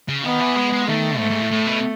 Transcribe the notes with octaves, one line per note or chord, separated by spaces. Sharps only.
C#3
D#3 B3
E3
G#3
G#3
D#3 A3
G#2 A3
G#2
A2
A2
B2